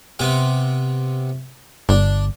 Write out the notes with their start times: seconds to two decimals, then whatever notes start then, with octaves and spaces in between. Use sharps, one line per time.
0.19 C3 B3 C4
1.89 G1 D4